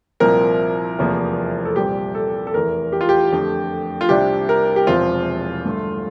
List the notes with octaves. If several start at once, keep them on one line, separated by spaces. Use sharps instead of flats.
C2 A#2 F3 C4 A#4
F1 E2 C3 F3 A#3
A4
C2 A#2 G3 C4 G4
A4
A4
F1 E2 E3 A#4
G4
F4
G4
F2 D3 A3
F4
C2 C3 G3 D4 G4
A#4
G4
E1 E2 C3 F3 C4 F4
G2 D3 A3